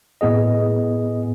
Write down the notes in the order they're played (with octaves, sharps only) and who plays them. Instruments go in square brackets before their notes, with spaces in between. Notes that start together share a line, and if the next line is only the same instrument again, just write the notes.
[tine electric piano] A2 B3 G#4 D#5